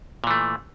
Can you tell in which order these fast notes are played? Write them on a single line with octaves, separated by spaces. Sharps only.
A#2 E3 A3